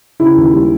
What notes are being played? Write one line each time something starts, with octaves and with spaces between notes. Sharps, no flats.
C#3 E4
D#2
G3